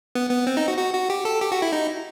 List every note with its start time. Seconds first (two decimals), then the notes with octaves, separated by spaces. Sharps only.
0.15 B3
0.31 B3
0.47 C4
0.57 D#4
0.68 F#4
0.78 F#4
0.94 F#4
1.10 G4
1.25 A4
1.41 G4
1.52 F#4
1.62 E4
1.73 D#4